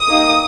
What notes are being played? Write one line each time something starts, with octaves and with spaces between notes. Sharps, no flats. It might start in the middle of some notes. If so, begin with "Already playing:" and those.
Already playing: D#6
A#3 D#4 G4